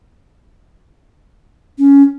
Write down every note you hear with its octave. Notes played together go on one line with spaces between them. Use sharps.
C#4